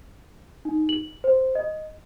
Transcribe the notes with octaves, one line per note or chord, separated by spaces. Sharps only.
D#4
F#7
C5
D#5